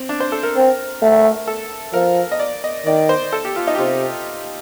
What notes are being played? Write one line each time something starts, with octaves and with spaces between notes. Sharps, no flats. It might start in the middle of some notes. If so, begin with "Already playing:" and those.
Already playing: C4
D4
C5
A4
A#4
C4
A3
A4
F3 A#4
D#5
D5
D#5
D#3 D5
C5
A4
G4
F4
D#4
G4
C3 F4